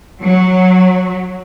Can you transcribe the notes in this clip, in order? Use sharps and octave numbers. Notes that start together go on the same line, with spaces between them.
F#3